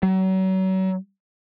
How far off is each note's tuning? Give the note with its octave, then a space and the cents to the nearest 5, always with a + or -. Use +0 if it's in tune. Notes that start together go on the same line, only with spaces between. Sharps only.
F#3 +35